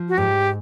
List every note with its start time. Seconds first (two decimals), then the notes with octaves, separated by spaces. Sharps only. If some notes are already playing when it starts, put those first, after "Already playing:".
Already playing: F3
0.09 F#4
0.18 G#2 G4